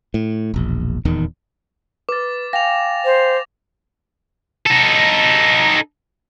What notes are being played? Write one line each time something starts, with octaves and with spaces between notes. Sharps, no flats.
A2
E1 A#1
D#1 E2 D#3
B4 D6 A6
F5 G5 G#5 A#6 F7
C5
D#4 A4